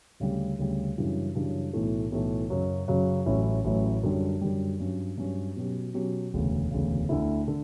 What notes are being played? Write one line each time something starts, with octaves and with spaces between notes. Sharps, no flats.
D2 C#3 G3
D2 C#3 G3
F#2 C#3 E3 G3 D4
F#2 C#3 E3 G3 D4
B1 A2 E3 A3
B1 A2 E3 A3
F#2 C#3 F#3
F#2 C#3 F#3
A1 A2 F#3 C#4 E4
A1 A2 F#3 C#4 E4
F#2 D3 G3
F#2 D3 G3
G2 F#3 C#4
G2 F#3 C#4
B2 F#3 C#4 G4
B2 F#3 C#4 G4
E1 D2 C#3
E1 D2 C#3
D2 D3 A3 E4
D3